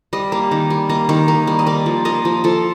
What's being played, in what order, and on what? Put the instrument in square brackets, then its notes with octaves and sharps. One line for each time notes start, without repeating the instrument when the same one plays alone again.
[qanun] G3 D#5
A#3
D#3
G3
A#3 D#5
D#3
A#3
G3
D#5
A#3 D5
F3
A#3 D#5
F3
F3 A4